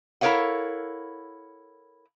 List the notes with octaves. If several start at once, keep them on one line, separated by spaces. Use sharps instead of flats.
E4 A4 A#4 C#5 F5 F#5